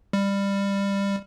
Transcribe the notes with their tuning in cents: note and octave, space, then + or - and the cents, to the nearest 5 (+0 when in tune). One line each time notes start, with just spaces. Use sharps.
G3 +20